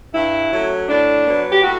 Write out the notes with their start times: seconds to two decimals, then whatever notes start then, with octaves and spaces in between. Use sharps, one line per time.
0.13 G2 E4
0.51 F#3 A3 C#4
0.88 A2 D4
1.27 F#3 B3
1.52 G4
1.63 A2 F#4